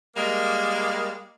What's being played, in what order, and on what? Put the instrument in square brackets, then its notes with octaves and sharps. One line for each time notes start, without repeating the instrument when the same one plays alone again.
[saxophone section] G3 G#3 A#3